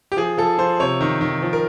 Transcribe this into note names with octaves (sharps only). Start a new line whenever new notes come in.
G4
F3 G#4
F3 A4
F3 C5
C3 C#5
D#3
D#3
F3
A#4